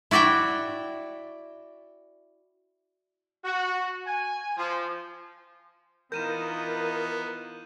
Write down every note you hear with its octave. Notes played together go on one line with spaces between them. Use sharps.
E4 F#4 D5 E5 G5
F#4
G#5
F3
E3 B3 D#4 F4 A#4 G6 D#7 E7